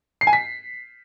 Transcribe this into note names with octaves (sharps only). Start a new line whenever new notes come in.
C7
G#5
B6